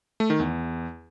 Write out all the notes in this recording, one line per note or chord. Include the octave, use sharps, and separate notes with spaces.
A3
D#3
E2